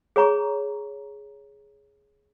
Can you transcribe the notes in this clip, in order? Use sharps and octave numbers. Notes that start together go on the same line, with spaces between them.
G#4 C#5 A#5 C#6